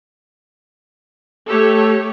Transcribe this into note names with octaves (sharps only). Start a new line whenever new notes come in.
A3 G4 A4 C#5